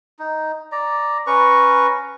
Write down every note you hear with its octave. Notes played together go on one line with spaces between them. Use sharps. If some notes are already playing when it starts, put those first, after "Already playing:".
D#4
D5 A#5
C#4 B4 A#5 C#6